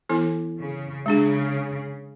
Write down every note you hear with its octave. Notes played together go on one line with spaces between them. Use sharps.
E3 B3 E4 A4
C#3
C#3 G#3 D4 G#4